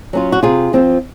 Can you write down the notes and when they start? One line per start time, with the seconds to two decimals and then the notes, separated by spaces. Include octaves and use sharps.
0.13 F#3 C#4 F4
0.32 F#4
0.43 C3 F4 G#4
0.73 F3 C4 F4